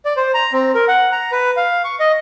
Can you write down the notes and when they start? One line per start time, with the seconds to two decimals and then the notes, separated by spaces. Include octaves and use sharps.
0.05 D5
0.17 C5
0.34 A#5
0.53 C4
0.75 A#4
0.88 F#5
1.12 A#5
1.32 B4
1.57 F5
1.84 C#6
2.00 D#5